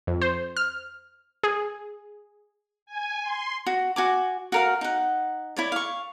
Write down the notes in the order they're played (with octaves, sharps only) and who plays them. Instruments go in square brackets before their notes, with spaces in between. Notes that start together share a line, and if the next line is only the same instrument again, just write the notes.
[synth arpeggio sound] F2
C5
F6
G#4
[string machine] G#5
C6
[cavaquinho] F#4
F#4 G#5 D6
F#4 A#4 F5
D#4 F#5
E4 C#5 D5
F5 C#6